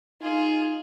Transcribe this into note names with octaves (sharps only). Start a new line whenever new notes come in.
D#4 F4 G#4